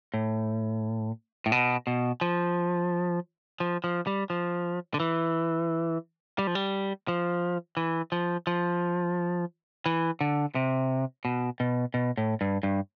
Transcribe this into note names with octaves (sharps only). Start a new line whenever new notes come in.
A2
A2
B2
B2
F3
F3
F3
G3
F3
D3
E3
G3
F3
G3
F3
E3
F3
F3
E3
D3
C3
B2
B2
B2
A2
G2
G2